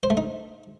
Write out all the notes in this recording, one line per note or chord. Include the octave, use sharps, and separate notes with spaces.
C5
A3
D#4